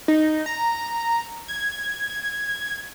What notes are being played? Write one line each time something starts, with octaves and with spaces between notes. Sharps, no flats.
D#4
A#5
G#6